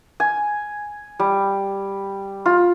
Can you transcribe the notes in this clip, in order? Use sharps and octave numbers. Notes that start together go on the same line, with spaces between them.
G#5
G3
F4